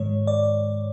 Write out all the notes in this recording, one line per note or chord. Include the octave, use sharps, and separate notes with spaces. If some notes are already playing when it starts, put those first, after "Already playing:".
Already playing: G#2 D#3 G#3 C#5
D5